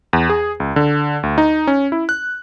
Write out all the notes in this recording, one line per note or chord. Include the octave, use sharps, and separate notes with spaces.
E2
G#4
C#2
D3
D2
D#4
C#4
E4
F#6